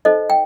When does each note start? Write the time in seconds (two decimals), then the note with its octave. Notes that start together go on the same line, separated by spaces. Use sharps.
0.05 D#4 A4 C5 D#5
0.30 G5